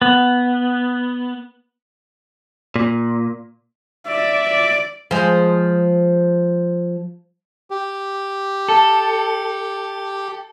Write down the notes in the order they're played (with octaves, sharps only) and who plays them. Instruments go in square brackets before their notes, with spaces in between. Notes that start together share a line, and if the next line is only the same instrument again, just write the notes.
[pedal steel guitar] B3
[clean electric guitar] A#2
[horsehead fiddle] D5 [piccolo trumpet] E5
[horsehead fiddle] D5
[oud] F3 G#3
[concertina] G4
[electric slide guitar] A4